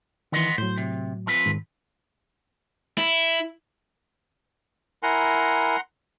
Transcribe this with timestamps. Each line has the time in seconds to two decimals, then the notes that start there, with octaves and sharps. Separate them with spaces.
0.32 D#3 E3 B3 D#5 C6
0.58 A2 F#3 C5
0.78 C3
1.27 F3 C4 B4
1.46 G#2 D#3
2.98 E4
5.03 E4 A#4 F#5 G#5 A#5 C6